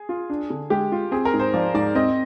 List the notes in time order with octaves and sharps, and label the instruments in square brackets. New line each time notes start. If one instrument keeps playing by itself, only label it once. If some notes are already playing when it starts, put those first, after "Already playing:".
Already playing: [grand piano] G#4
[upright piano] F4
D4
D3
[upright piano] G#3 [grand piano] G4
[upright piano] F4
[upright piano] C4 [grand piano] G#4
[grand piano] A#4
[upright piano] G#2
[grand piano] C5
[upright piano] F3 [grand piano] D5
[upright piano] G#2 [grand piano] D5
[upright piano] C4 [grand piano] D#5